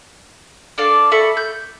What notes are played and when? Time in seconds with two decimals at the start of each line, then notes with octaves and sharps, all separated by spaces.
0.78 D4 A4 D5 F5
1.11 A4 E5 B5 C#6
1.37 G6